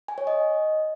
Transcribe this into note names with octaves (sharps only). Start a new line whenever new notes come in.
G#5
C#5
D#5